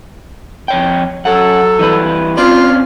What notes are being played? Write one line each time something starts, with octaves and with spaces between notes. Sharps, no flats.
F2 C#5 G5
F#2 F#3 A4 F#5
E3 G3 B4
C4 C#4 F4 D5